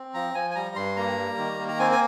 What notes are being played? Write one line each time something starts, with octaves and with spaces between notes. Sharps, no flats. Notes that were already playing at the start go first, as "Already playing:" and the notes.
Already playing: C4
F3 A#5
F3 G#5
G#5
G3 A#5
G2 C6
A#3 A#5
G3
D#3
A#3
A#5
C4 G#5
G#5